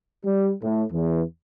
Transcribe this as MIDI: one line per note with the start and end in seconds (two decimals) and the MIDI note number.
0.24 0.51 55
0.62 0.83 45
0.92 1.22 40